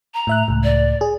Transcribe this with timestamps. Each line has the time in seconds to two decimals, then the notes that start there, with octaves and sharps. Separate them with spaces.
0.14 A#5
0.27 A2 E5 F#6
0.48 C#2 A2
0.64 D5
1.01 G#4